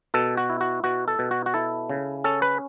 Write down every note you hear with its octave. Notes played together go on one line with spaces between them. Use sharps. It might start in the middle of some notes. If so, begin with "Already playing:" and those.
B2 A4
F#4
E4
F#4
B2 F#4
A4
B2
F#4
F#4
E4 A4
C#3
C#4 A4
B4